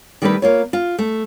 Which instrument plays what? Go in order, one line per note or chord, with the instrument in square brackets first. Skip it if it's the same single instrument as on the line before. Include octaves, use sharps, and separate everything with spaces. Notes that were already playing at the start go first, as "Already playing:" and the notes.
[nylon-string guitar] D#3 G3 A3 G4 A#4 B4
A#3 F4 C#5
F4
A3